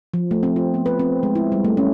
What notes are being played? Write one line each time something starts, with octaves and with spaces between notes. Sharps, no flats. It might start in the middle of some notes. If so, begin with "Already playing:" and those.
F3
A3
C4
F4
B3
B4
C4
G#3
E4
G3
A3
C#4